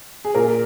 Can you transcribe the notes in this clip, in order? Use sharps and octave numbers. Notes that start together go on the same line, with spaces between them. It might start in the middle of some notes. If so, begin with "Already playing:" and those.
G#4
A#2 A#4